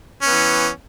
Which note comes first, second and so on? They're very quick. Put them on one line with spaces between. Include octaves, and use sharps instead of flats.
C#4 B3 E3